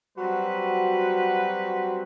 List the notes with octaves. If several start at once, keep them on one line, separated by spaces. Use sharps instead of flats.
F#3 G3 C4 F#4 B4